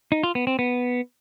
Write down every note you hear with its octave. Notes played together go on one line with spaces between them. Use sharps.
D#4
F4
B3
C4
B3